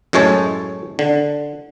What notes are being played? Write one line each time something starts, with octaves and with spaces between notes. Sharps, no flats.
F#2 A2 G#3 C#5 A5
D3